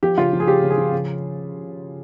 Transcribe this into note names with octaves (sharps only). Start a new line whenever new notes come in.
F3 G4
C#3 F4
F3
G#4
C#3 G4
C#3
G#4
F3
C#3